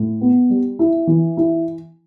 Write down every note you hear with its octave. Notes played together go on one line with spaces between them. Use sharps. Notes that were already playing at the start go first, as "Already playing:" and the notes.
Already playing: A2
B3
G3
E4
E3
E4